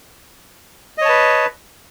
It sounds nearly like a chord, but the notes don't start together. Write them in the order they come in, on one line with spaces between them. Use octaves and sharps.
D#5 C#5 A5 B4